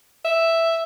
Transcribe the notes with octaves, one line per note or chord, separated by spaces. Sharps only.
E5